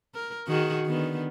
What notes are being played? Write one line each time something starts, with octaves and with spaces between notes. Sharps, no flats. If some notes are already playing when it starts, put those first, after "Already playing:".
A#4
D#3 F#4 G#4
D3 D#3 B3